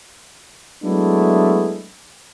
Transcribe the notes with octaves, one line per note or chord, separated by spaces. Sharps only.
F#3 G#3 A3 B3 D4 E4